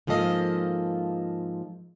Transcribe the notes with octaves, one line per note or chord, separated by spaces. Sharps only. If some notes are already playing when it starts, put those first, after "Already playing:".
G#2 F3 A#3 A4 D#5 F5